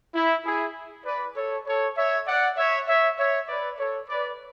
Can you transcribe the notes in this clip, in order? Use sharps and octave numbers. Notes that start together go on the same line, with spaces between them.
E4
E4 G#4
B4 D5
A4 C#5
A4 C#5
C#5 E5
D5 F#5
C#5 E5
C#5 E5
C#5 E5
B4 D5
A4 C#5
B4 D5